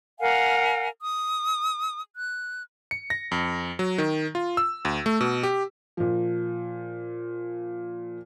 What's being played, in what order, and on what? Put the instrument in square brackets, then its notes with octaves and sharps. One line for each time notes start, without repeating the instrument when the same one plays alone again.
[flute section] A#4 F5 F#5 G#5
D#6
F#6
[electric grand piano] C#7
A#6
F2
F#3
D#3
F4
E6
D2
A3
B2
G4
[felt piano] A#2 F3